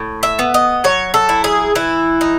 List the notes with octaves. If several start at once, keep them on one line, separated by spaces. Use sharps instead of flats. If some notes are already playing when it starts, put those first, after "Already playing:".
Already playing: A2
E5
B3
D#5
F#3 C#5
A4
E4
G#4
E3 E4
D#4